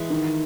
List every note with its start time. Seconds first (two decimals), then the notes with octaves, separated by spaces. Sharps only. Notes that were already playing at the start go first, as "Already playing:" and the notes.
Already playing: E3 G#3
0.10 D#3